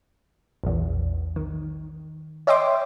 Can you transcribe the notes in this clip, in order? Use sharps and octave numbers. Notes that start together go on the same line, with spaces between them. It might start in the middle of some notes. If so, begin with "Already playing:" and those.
A#1 E2
D#3
C#5 D#5 E5 G5 C6 D6